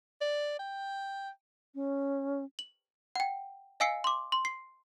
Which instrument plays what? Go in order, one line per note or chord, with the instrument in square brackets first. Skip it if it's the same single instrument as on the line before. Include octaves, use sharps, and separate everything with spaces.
[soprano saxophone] D5
G5
[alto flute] C#4
[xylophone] F#7
F#5 G5
D#5 F5 G#5 E6 C7 C#7
C6 D6
C6
C7